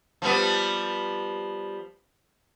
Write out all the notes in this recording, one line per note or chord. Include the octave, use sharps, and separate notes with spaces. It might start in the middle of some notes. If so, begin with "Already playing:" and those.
F3 G3 B3